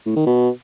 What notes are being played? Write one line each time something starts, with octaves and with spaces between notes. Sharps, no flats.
A2
D#3
B2